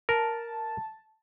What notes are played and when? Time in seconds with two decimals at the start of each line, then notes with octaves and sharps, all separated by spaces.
0.09 A#4 A5